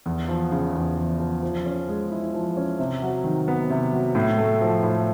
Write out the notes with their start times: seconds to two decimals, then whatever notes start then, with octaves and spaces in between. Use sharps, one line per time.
0.06 E2
0.28 F3
0.52 C#3
0.75 E2
0.97 E2
1.20 F3
1.43 F3
1.66 C#4
1.88 G#3
2.11 E4
2.34 F3
2.57 C#4
2.79 C3
3.02 F#3
3.24 D#3
3.48 B3
3.70 C3
3.92 F#3
4.15 A2
4.38 A3
4.61 F3
4.83 A2